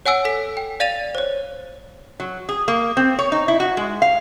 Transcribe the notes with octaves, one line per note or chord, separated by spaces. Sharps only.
C#5 F#5 G#5 E6 D7
A4 B6
G5
D5 F5 A6 D#7 F7
C5 C#5
F#3
G#4
A#3
C4
C#5
D#4
E4
F#4
G#3
F5